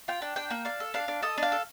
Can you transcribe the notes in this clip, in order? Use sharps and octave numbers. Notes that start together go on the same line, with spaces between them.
F4 G5
D4
D4 G5
A#3
D4 F5
A4
D4 F5
D4
A4 D#5
D4 F5
A4